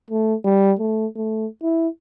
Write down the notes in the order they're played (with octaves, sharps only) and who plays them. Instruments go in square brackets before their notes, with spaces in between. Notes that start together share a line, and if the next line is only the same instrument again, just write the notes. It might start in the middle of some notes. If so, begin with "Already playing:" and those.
[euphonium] A3
G3
A3
A3
E4